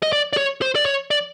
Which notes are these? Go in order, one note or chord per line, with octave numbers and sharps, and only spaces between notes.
D#5
D5
D5
C#5
C5
D5
C#5
D5